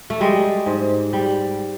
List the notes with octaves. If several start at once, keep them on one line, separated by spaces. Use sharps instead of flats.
A3
G3 G#3
G#2
G3